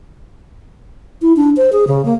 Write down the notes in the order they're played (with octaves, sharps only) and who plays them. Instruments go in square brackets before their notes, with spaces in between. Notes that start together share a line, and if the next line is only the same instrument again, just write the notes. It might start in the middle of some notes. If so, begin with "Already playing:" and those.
[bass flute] E4
D4
C5
G#4
C#3
A#3